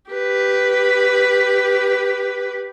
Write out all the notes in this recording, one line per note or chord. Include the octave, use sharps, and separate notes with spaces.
G4 B4